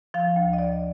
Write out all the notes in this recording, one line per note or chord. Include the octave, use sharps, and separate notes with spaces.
F3 F5
D2
D#5
F3 D5